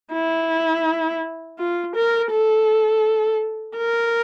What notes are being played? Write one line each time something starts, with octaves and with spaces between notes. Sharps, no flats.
E4
F4
A#4
A4
A#4